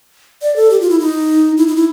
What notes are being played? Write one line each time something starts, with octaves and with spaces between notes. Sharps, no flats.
D5
A4
G4
F4
E4
D#4
E4
D#4
E4